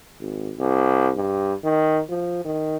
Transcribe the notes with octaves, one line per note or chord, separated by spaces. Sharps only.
G#1
C2
G2
D#3
F3
D#3